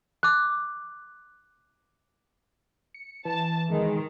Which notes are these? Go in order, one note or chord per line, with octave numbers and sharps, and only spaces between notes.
D6 F#6
C#7
E3 A5
D#3 G#3